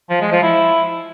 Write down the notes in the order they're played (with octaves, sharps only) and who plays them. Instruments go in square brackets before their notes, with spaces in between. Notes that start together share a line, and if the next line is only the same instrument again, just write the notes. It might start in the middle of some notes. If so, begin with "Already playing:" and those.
[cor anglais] F3
G#3
F3
E4